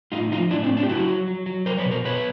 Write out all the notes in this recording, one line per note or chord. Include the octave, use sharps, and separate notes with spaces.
A2 D#4 F4
F3 D#4 F4
A2 D4 E4
C4 D4
A2
C4 D4
G4
F#3 E4 F#4
F#3
F#3
F#3
F#3 A#4 C5
B4 C#5
B2
A#4 C5
B2 B4 C#5